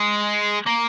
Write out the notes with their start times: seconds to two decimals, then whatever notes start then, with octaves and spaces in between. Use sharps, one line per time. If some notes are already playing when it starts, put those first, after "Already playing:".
Already playing: G#3
0.66 A#3